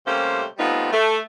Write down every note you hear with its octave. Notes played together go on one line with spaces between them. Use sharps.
C3 G3 A3 A#3 C#4 C5
G3 A3 B3 C4 D#4 F4
A3